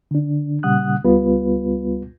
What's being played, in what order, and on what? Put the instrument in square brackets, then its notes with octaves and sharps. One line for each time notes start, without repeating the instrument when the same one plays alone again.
[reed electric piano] D3 D4
A#2 C#3 G3 F#5 D#6 F#6
C#2 G3 B3 F4 B4